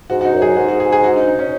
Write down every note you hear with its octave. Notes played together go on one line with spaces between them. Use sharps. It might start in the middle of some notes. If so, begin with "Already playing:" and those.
G#2 F#4
F#4
D#4
F#2
G#4
G#2 F#4
F#4
G#4
G#4
F#4
D#4
D#4
C#4